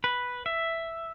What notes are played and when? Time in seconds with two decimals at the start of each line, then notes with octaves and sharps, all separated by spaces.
0.04 B4
0.46 E5